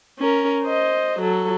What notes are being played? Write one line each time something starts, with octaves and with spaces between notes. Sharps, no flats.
C#4 A#4
C5 D#5
F#3 A4